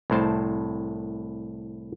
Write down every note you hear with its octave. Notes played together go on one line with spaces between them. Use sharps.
C2 A2 C5 A5